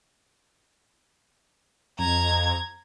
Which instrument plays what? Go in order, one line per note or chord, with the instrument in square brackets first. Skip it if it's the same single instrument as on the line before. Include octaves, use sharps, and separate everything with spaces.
[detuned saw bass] F2 [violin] A#5 G#6